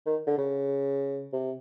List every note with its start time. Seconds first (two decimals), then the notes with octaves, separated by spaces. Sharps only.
0.06 D#3
0.27 D3
0.38 C#3
1.33 C3